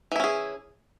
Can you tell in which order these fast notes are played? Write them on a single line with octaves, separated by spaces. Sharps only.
E3 E4 C#4 G#4